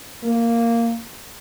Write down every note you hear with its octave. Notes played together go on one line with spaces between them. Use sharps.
A#3